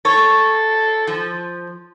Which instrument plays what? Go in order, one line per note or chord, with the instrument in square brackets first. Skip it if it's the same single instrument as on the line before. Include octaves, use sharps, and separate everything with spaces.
[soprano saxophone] A4 [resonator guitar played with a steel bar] C#5
[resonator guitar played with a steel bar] F3